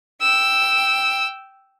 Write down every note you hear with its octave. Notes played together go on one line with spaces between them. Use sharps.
G5 E6